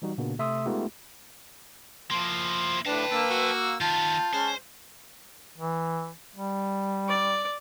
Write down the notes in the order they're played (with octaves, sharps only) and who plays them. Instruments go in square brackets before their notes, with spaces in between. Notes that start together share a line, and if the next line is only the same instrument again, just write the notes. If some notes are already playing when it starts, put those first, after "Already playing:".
[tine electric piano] E3 G3 D#4 F#4
A#2 C#3 A#3 B3 D4 F#4
C3 A3 E5 C6 D#6 E6
G#3 A3 B3 D#4 F4 G4
[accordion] F3 C6 [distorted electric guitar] A#3 E4
[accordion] A2 D4 [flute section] B4 G5 [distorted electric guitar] F5 A5
[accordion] A#3 E6 [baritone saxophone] D4
[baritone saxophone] F#4
[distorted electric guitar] D#3 B3 [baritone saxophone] F4 [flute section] A5 [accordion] G6
[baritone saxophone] G#3 [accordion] C#4 [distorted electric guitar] C5
[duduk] E3
G3
[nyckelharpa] D5